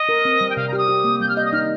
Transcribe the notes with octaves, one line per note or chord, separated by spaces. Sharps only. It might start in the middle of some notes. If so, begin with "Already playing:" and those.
Already playing: D#5
A#4
C4
G3
G5
C3 F5
A#5
G4 D#6 F6
G4
A#3
G3 G6
F6
D#5 G6
D#6
D#4 F6